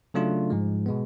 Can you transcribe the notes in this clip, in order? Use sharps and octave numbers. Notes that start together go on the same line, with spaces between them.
C#3 F#3 A3 D4 F4
G#2 F3 G#3
B2 G#3 B3